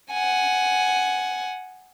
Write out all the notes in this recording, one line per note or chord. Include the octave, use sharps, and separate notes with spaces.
F#5 G#5